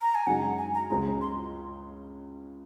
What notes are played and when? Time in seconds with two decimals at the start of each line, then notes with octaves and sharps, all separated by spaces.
0.02 A#5
0.15 G#5
0.27 F#2 C#3 G#3 D#4 G#4 F#5
0.58 G#5
0.74 A#5
0.90 C#2 C#3 G#3 A#5
1.21 C6